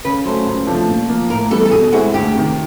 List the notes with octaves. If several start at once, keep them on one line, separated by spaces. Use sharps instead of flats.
C#3 B4
F#3 A3 C#4 C5
C#2
C3 F3 A3 D4
A#2
F3 A#3
A2 A#4
E3 G3 B3 A4
A4
B2 G#4
G#3 C4 E4 F#4 G#4
D2 G4
C3 D#3